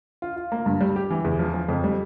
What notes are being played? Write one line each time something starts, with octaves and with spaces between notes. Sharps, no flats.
F4
F4
A#3
G2
G3
G4
E3
E2
F3
F3
F2
G3